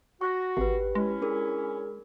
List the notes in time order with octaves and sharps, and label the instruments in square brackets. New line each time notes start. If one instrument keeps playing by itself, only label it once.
[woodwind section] F#4 [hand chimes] C#6 F#6 A#6
[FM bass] G#1 [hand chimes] G4 B4
[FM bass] G#3 [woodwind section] C#4 E4
[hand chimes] D4 G#4 A#4